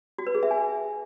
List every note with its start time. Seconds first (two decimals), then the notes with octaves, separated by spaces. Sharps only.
0.18 F#4
0.27 B4
0.35 G#4
0.43 E5
0.51 G#5